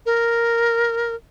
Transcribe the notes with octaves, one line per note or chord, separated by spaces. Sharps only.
A#4